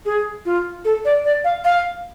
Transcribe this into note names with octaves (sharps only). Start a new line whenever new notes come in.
G#4
F4
A4
D5
D5
F5
F5